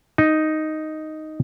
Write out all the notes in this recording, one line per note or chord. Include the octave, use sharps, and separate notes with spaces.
D#4